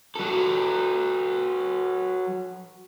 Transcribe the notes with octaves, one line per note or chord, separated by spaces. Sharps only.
F#3 A4